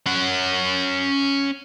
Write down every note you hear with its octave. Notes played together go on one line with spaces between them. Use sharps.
C#4 F#5